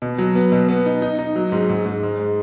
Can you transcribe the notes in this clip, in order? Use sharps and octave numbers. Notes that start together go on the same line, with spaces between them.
B2
F#3
B3
B2
B3
D#4
D#4
D#4
F#3
G#2
G#2
G#2
G#2
G#3